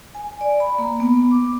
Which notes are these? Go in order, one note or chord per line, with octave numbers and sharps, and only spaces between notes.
G#5
D5
B5
A#3
B3
D6